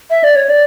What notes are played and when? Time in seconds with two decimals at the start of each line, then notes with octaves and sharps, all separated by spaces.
0.10 E5
0.24 D5
0.36 C#5
0.49 D5